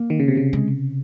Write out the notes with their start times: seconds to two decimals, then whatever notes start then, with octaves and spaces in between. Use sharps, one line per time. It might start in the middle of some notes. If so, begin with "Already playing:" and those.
Already playing: A#3
0.10 D#3
0.20 C#3
0.28 C3
0.37 C#3
0.53 G#3